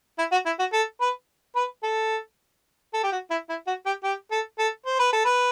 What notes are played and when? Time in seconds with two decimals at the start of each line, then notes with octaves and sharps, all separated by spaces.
0.18 E4
0.32 F#4
0.46 E4
0.59 F#4
0.73 A4
1.01 B4
1.56 B4
1.83 A4
2.94 A4
3.04 G4
3.12 F#4
3.30 E4
3.49 E4
3.67 F#4
3.86 G4
4.04 G4
4.31 A4
4.59 A4
4.86 C5
4.99 B4
5.13 A4
5.25 B4